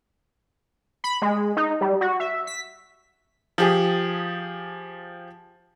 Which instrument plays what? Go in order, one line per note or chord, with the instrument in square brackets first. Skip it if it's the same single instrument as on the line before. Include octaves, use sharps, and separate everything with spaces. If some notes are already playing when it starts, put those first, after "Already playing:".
[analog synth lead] B5
G#3
D#4
G3
F#4
E5
B6
[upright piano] F3 G4 G#4